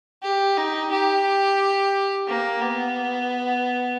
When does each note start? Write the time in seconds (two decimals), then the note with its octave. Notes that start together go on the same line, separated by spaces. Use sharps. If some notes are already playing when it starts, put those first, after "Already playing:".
0.23 G4
0.57 D#4
0.91 G4
2.28 A#3
2.62 B3